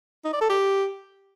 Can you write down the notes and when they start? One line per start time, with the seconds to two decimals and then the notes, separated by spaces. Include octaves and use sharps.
0.25 D#4
0.33 D5
0.41 A4
0.50 G4